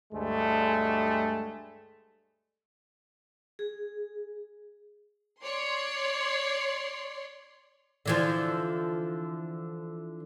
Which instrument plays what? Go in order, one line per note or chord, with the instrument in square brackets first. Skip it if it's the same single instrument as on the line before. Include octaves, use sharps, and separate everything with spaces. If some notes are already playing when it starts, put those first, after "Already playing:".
[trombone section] D2 G2 G#3 A3
[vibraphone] G#4
[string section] C#5 D5 C6
[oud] D3 E3 F3